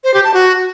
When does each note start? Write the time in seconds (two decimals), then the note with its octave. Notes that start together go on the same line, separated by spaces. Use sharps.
0.04 C5
0.14 G4
0.24 A5
0.34 F#4